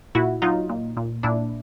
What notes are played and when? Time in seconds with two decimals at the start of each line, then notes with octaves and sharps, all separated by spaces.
0.15 A#2 E4 F#4
0.42 F#3 D#4 F4
0.69 A#2
0.97 A#2
1.23 A#2 D4 E4